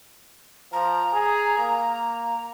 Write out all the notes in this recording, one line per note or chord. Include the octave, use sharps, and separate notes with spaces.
F3 A#5
G#4
A#3